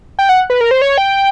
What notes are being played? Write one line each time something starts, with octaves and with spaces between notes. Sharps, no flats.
G5
F#5
B4
A#4
C5
C#5
G5